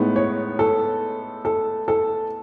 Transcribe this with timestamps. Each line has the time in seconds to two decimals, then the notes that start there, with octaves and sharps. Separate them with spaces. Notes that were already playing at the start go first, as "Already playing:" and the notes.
Already playing: A2 G#3 B3 D#4
0.16 C#5
0.59 A4
1.45 A4
1.88 A4